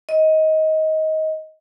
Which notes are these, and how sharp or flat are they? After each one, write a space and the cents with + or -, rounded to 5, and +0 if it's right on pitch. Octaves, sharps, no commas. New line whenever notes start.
D#5 +20